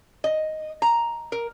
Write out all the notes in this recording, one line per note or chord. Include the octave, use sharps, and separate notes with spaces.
D#5
A#5
A#4